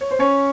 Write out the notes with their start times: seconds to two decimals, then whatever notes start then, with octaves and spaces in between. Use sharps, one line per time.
0.01 C#5
0.11 C5
0.19 C#4 C#5